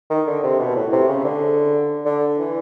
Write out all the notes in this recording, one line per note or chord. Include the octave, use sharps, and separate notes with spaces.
D#3
D3
C3
B2
A2
C3
C#3
D3
D3
E3